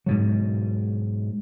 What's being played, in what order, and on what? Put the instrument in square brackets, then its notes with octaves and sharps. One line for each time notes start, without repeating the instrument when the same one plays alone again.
[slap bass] G#2 B2 F#3